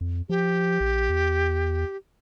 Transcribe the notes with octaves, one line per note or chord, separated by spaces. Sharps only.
F2
F3 G4
A#1
E2